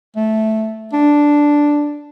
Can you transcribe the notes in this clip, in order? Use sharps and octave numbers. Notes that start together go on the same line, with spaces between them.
A3
D4